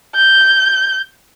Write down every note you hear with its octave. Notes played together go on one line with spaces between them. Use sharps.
G6